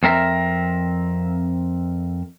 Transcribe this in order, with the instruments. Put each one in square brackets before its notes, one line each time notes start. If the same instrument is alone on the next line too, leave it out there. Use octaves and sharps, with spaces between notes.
[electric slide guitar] F2 C4 A#4 E5